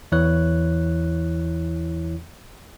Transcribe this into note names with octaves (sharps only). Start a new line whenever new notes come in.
E2 E3 E4 C#5 F#6